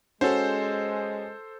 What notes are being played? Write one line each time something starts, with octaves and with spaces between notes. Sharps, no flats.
G#3 C#4 F#4 G#4 A4 C5